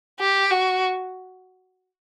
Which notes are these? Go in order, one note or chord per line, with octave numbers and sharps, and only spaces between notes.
G4
F#4